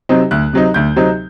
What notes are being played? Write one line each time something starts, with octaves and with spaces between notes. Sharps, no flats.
C3 F#3 C4 D#4
D2 F#6
C3 F#3 C4 D#4
D2 G6
C3 F#3 C4 D#4